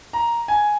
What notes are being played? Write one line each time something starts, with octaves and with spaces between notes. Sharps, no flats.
A#5
G#5